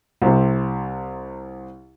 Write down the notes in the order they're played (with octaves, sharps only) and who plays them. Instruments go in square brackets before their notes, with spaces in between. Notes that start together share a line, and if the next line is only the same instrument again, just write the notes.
[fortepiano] C2 C3